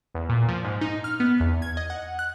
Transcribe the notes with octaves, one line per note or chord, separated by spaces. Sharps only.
E2
A#2
F3
G#2
D#4
F6
B3
E2
G#6
D#5
F#5
F#6